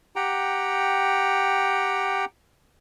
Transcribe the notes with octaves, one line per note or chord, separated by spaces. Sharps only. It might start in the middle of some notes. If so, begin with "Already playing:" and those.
G4 F#5 G5 A#5